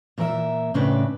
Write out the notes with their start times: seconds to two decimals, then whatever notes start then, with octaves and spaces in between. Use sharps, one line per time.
0.18 A#2 E3 A#4 B4 E5
0.74 A2 C#3 C4 D4 B4